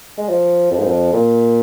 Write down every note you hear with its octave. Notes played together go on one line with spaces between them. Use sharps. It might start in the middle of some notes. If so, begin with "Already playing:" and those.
G#3
F3
F2
G#2
F2
A#2